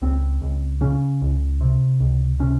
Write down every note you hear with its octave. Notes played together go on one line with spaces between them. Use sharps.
C#2 C4
C#2
C#3 C#4
C#2
C3
C#2
C3 C#4